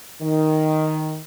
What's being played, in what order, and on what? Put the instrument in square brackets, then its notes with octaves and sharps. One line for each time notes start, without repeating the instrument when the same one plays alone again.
[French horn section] D#3